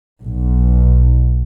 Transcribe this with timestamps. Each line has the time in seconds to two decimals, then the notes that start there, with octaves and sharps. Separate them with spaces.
0.23 B1